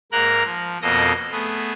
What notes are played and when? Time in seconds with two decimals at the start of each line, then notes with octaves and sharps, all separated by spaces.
0.12 G#2 A#3 A#4 F6 F#6 A#6
0.44 F3
0.82 F2 B2 A#3 A4 D#5 A#6
1.32 A3 B3 G#4